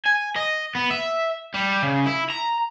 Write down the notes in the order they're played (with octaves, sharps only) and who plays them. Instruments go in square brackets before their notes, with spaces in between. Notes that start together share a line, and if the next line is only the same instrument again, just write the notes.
[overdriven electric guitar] G#5
D#5
B3
E5
G3
C#3
E4
A#5